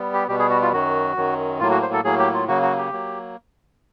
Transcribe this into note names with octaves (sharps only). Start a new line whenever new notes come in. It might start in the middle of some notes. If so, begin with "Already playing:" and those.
Already playing: G3 B3
G4
B2 G3 B3 G4
G#4
F#4
F4
F#2 D#3 F#3 F#4
F#2 D#3 F#3
A2 F#3 A#3 F4
F#4
C5
A4
A2 F#3 A#3 G#4
G4
F4
C#3 F#3 A#3 F#4
F#4
G4
F#3 A#3